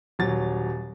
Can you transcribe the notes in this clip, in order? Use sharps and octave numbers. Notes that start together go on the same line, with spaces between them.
D#1 F#3 A6